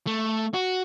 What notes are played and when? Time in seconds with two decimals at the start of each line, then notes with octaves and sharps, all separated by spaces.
0.07 A3
0.54 F#4